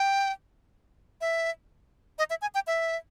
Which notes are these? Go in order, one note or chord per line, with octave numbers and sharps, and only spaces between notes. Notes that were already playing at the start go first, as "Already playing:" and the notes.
Already playing: G5
E5
D#5
E5
G#5
G5
E5